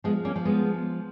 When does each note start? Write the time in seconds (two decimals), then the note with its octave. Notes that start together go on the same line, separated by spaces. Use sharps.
0.04 F3 G#3 B3
0.25 A#3 C#4
0.36 F3
0.45 G#3 B3